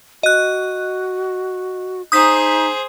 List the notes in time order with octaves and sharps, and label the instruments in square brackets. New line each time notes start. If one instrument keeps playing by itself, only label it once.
[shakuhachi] F#4 [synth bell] D#5 F#6
[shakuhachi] D#4 [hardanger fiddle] G#4 C5 [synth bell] D#6 G6 B6